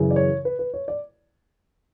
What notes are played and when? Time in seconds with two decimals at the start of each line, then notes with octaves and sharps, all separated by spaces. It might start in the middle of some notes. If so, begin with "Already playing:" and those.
Already playing: F#2 C#3 E3
0.11 D5
0.16 C#5
0.45 B4
0.59 B4
0.74 C#5
0.88 D5